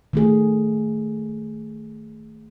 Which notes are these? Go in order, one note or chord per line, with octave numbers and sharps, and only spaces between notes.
D#3 A3 G#4